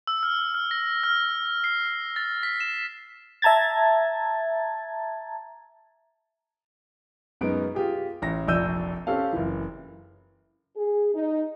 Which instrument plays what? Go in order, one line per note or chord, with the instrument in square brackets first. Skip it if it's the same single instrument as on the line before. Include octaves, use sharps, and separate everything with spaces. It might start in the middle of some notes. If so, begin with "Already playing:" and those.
[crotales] E6
F6
F6
A#6
F6
C7
A6
B6
E7
[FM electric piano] E5 A5 A#5 G#6 A6
[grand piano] F#2 G#3 B3 D#4 D7
F4 G4 G#4
A1 A#6
F1 A#1 D5 E6 G6 D#7
C4 C#4 G4 A4 F5
F#1 E3
[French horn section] G#4
D#4